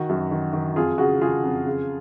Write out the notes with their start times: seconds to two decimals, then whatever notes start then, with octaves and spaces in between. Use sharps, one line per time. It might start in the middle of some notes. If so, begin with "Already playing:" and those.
Already playing: D#3 F#4
0.09 F#2
0.31 D#3
0.53 D#3
0.76 F2 F4 G#4
0.98 C#3 F#4
1.21 C#3 F4 G#4
1.44 F2
1.66 C#3